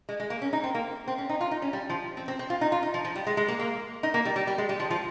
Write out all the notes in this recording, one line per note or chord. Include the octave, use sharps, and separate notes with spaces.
G#3
G#3
A#3
C#4
D#4
C4
A#3
C4
C#4
D#4
F4
D#4
C#4
G3
F3
C4
C4
C4
F4
D#4
F4
D#4
F3
F3
G3
G#3
G#3
A#3
A#3
D#4
A#3
G3
G3
G3
G#3
G3
F3
F3